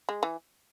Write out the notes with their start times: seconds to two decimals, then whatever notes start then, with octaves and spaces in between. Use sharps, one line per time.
0.09 G#3
0.23 E3